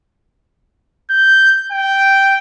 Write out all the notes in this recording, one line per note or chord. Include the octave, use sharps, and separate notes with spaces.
G6
G5